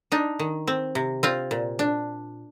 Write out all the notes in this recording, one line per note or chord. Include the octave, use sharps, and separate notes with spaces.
D4 D#4
D#3
C4
C3
C4 F4
A#2
D4